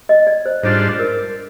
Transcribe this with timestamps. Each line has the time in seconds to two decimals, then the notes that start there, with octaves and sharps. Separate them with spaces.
0.09 D#5
0.27 D5
0.46 C5
0.63 G#2 G3 D4 F4 C5
0.99 A#4